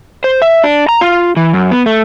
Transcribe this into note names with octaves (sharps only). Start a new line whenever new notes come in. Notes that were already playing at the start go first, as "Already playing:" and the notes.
C5
E5
D4
A#5
F4
E3
F#2
B3
A3